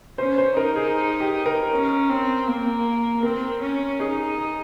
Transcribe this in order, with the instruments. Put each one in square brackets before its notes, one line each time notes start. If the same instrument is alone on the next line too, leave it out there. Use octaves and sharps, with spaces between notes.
[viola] C#4 [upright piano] C5
[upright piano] C5
[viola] D#4 [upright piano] A#4
[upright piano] G#4
G4
A#4
[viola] C#4
C4
A#3
[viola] C4 [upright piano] A#4
[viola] C#4
[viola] D#4 [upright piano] G#4
[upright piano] G#4